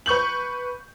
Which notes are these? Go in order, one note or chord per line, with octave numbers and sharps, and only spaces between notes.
B4 C#6 G6 F#7